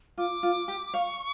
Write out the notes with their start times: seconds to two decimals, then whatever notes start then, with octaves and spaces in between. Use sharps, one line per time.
0.17 F4 D6
0.43 F4
0.68 G4
0.94 F5 C#6